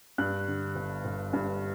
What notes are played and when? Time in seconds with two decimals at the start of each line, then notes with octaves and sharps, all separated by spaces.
0.18 G2 F#6
0.48 D3
0.75 G1
1.04 G1
1.33 G2